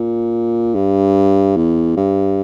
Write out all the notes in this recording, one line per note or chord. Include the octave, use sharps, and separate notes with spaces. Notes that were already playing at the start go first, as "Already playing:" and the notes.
Already playing: A#2
G2
E2
G2